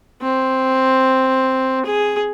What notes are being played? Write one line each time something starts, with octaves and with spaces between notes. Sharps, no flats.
C4
G#4